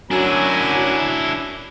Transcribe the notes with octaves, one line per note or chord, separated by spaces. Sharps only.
F#2 F#3 D4 E4 G#5 A#5